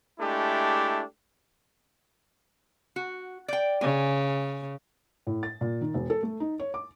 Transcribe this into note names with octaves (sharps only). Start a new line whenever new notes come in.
G#3 A3 D4 E4 G4
F#4
D5 G5
C#3 G#5
A2
A6
A#2
D#3
E1
A4
A3
D#4
C#5
D6